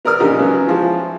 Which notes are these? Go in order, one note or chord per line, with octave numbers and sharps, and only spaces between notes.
B3 A#4 D5 D#6 F6
A#1 C#3 D#4 G4 A#4
C#3 F#3 B3
E3 F3 G#3